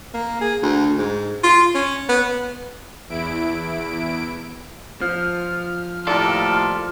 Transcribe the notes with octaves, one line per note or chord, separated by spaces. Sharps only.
A#3
G#4
D2
G#2
F4
C#4
B3
E2 E4 D7
F3 F6
D#2 A2 F4 A4 D5